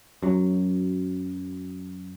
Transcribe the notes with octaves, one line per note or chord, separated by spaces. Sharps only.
F#2 F#3